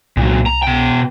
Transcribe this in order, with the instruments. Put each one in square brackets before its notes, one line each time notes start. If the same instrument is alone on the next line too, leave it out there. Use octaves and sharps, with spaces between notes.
[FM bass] C2 [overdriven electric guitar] A#2 F#3
[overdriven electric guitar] A#5
B2 G5